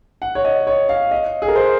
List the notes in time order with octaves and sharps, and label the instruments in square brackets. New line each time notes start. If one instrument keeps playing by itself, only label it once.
[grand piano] F#5
C#5
D#5
C#5
F5
D#5
G#4
A#4
C5